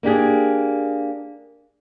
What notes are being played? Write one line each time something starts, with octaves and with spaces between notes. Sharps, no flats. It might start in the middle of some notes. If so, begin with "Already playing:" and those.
A#3 D4 G4 G#4